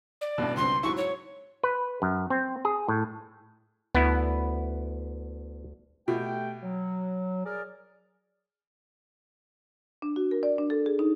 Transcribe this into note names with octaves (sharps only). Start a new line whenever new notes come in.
D5
A1 G2 B2
C#2 G2 C4 C6
G#2 F#3 E4 C#6
C#5
B4
F#2
C4
G#4
A2
D2 B3 E4
B2 A3 G4 G5
F#3
G#4 A#4 D5
D4
F#4
A#4
D5
D4
A4
G#4
D#4